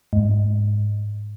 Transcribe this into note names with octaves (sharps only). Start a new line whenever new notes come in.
G#2